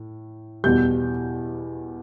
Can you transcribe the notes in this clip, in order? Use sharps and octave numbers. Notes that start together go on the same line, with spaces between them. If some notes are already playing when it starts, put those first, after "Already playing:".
Already playing: A2
E2 B2 G3 G6